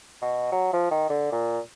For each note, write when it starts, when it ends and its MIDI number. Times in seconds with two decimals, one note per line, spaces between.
0.22 0.49 47
0.52 0.73 54
0.73 0.86 53
0.91 1.08 51
1.10 1.32 50
1.32 1.59 46